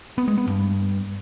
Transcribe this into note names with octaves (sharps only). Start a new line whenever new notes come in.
B3
G#3
B3
G2